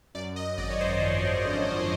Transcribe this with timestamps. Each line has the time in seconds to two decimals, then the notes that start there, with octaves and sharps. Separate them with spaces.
0.15 F#2 D5
0.36 D#5
0.58 G#1 D5
0.70 C#5
0.80 C5
1.02 F3
1.45 D3